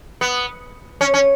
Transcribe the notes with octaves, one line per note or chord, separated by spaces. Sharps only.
B3
C#4
C#4